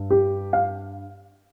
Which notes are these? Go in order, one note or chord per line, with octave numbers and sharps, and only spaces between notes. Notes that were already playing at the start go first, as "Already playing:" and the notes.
Already playing: G2
G4
F5